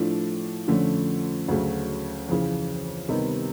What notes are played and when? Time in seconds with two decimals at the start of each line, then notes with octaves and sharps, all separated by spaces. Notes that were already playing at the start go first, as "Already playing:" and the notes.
Already playing: A2 F3 A3 D4
0.68 F2 D3 F3 A3 C#4
1.48 D2 C#3 F#3 A3 C#4
2.28 F2 C#3 E3
3.09 C3 D#3 G3 B3 D#4